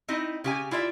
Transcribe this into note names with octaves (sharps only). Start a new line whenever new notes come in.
C4 D#4 E4 D#5
C#3 G4 G#5
E4 F4 D5 E5